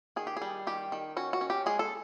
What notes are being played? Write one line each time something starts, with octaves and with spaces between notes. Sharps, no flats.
D#3 G#4
G4
G#4
G3
D#3 G4
D#3
C#4 F#4
F#4
C#4
G4
G#3 G#4
A4